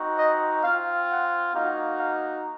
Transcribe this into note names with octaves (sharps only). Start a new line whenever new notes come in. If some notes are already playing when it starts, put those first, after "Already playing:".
Already playing: C4 D#4 F#4
D#5
C4 F4 F5
F#5
A#3 D#4 F#4 F5
F5